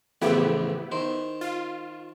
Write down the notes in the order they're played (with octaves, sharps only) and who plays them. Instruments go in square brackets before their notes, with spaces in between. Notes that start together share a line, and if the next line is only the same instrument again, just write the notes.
[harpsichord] A1 F2 C#3 [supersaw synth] B3 E4 G4
[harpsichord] D#3 C5
[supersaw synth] F4